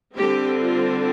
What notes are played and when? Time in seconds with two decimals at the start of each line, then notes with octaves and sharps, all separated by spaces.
0.14 D3 G3 C4 G4
0.56 F4